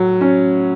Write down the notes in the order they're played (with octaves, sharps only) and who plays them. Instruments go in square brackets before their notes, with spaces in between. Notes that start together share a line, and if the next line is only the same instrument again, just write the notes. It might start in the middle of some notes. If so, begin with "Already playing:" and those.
Already playing: [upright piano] A2 F#3
C#4